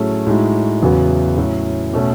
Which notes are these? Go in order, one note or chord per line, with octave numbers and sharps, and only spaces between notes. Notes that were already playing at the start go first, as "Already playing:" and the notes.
Already playing: A2 F#3 A3 C#4 G#4
A2 G#3 D#4 F#4
E2 C#3 F#3 B3 F#4
A2 F#3 C#4
B2 A3 C#4